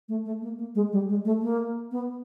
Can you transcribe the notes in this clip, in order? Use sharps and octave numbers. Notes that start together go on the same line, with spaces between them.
A3
A3
A#3
A#3
G#3
G3
G#3
A3
A#3
B3